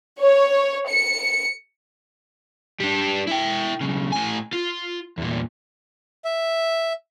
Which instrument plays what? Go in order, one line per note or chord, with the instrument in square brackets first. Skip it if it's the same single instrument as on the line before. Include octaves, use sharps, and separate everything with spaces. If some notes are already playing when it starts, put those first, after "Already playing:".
[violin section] C#5
C#7
[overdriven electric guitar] G3 D4
E4 G5
B1 C#3
A2 G#5
F4
E2 A#2
[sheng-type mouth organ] E5